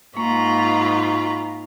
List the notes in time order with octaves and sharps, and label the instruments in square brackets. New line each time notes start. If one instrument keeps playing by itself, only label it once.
[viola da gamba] G#2 [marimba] A#3 [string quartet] F4 A#5 B5 [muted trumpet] C#6